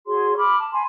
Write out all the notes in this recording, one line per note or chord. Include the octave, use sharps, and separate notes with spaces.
F#4 G#4 C#5 C6
B5 D6 F6
A5
G#5 B5 C6